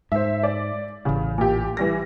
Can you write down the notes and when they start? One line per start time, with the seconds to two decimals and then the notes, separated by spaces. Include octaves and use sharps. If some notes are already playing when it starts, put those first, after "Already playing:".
0.12 G#2 C5 E5
0.43 D5
1.05 A1 A2 C#3
1.38 A#2 G4
1.77 E3 G3 A#6